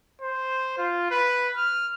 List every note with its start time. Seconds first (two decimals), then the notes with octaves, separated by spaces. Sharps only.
0.22 C5
0.78 F4
1.11 B4
1.57 F6